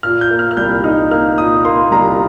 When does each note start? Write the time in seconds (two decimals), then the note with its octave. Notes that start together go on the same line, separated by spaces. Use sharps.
0.03 A#2 F6
0.21 G6
0.30 A#3
0.39 F6
0.51 F6
0.57 C2 G6
0.84 D#4 F6
1.11 A#3 F6
1.38 A#2 D#6
1.65 A#3 C6
1.91 C2 A#5